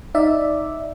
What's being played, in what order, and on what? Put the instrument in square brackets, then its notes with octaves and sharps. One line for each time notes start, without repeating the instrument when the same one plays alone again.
[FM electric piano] D#4 D5 E5